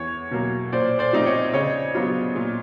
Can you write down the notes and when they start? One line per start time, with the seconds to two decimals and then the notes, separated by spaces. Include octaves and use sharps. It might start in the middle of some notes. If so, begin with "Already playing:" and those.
Already playing: E2 C#5
0.31 B2 F#3 A#3
0.72 A#2 C5 D5
0.99 C5 D5
1.13 F3 A3 C4 D#4
1.26 C#5 D#5
1.53 C#3 C#5 D#5
1.95 F#3 B3 D4 F4
2.36 A#2